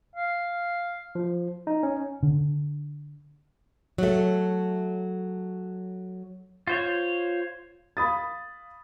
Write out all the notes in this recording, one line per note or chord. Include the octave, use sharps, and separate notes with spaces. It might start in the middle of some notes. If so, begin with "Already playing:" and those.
F5
F3
D#4
C#4
D3
F#3 A3
F4 C5 C#5
F5 B5 D#6 A6